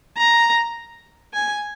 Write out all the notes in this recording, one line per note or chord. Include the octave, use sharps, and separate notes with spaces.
A#5
G#5